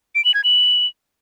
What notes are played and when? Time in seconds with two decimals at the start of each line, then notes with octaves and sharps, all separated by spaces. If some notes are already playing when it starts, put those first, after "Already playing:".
0.15 D7
0.25 F#7
0.34 G#6
0.44 F#7